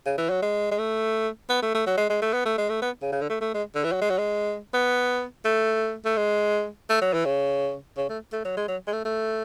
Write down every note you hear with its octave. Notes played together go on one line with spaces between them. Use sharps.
C#3
E3
F#3
G#3
G#3
A3
B3
A3
A3
F#3
G#3
G#3
A3
B3
A3
G#3
A3
B3
C#3
C#3
D3
A3
A3
G#3
D3
E3
F#3
G#3
F#3
G#3
B3
A3
A3
G#3
A3
F#3
E3
C#3
C#3
A3
A3
F#3
G#3
F#3
G#3
A3
A3